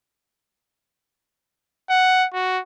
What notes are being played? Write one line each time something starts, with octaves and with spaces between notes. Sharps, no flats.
F#5
F#4